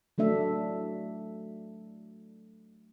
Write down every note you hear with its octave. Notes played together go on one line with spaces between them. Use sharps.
F#3 A3 D4 E5